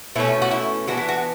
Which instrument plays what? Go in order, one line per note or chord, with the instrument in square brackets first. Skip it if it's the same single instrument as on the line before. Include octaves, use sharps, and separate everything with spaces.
[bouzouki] B2 A3 C#4 E4
F#4
E4
E3 B3 D4 F#4
E4
F#4